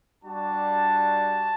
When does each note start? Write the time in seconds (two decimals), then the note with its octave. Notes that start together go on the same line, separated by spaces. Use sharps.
0.24 G3 D4 F#4 A5